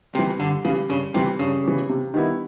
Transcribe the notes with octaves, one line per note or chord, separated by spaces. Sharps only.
C3 E3 G3
G2 D3
C#3 E3 G3
G2 C#3
C3 E3 G3
G2 C#3
E3 G3
C3
D#3 G3 B3 E4